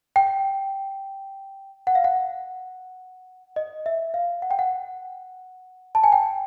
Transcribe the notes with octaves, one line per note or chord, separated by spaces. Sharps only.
G5
F#5
F5
F#5
D#5
E5
F5
F#5
G5
F#5
A5
G#5
G5